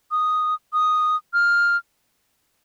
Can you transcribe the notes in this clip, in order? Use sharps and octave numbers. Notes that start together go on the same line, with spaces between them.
D#6
D#6
F6